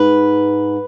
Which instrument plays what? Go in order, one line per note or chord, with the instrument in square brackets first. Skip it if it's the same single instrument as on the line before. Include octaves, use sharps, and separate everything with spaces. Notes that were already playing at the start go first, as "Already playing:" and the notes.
Already playing: [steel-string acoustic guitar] G#2 B4